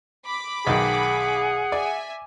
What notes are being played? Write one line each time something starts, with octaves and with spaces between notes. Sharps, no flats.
B5 D6
B1 D#3 G#4 F#5
D5 E5 G#5